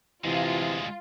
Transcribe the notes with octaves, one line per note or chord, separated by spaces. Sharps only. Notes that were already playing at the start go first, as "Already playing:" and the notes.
D2 C3 E3 G#3 F4